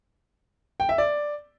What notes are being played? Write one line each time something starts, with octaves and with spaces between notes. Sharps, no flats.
G5
E5
D5